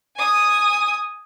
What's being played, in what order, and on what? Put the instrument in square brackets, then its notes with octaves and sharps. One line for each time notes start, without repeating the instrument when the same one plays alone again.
[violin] G#5 D#6